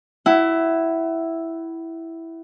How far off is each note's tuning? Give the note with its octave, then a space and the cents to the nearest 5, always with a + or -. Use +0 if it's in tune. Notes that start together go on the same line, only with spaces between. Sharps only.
E4 +0 F#5 +30